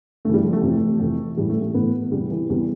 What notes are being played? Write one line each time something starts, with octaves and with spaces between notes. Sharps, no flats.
G2 E3 G3 A3
F3
A3
F2 C3 E3
F2 C3 E3
A2 E3 G3
A3
A3
A2 E3 B3
E2 C3 E3 G3
E3
E2 C3 E3 G3